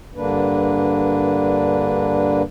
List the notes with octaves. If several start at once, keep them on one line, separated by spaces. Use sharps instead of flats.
G2 D3 A#3 D4 B4